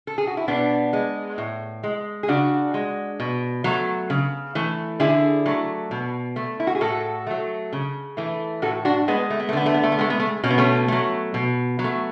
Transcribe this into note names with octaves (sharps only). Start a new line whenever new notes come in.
A4
G#4
F#4
E4
B2 B3 D4
G#3
A2
G#3
G#4
C#3 D4 F#4
G#3
B2
F#3 A3
C#3
E3 A3
D3 E4 G#4
F#3 A3
B2
A3
E4
F#4
G#4
A2 F#4 A4
F#3 A3
C#3
E3 A3
A2 F#4 A4
D4 F#4
G#3 B3
A3
B3
A3
D3 B3
A3
B3
A3
B3
G#3 A3
B3
A3
B2 C#4
B3
A3 C#4
F#3 A3
B2
F#3
A3